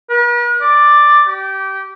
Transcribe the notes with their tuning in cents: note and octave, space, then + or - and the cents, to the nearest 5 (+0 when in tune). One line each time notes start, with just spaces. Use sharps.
B4 -45
D5 +5
G4 -20